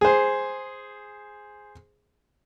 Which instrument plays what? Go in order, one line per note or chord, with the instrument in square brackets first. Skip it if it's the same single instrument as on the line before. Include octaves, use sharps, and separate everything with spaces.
[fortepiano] G#4 C5